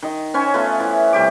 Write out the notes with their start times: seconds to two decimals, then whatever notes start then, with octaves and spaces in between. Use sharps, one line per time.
0.03 D#3 D#5
0.34 C#4 C5 C#5 G#5
0.54 A3 B3 F4
0.80 E3
1.13 C3 G3 G4 D6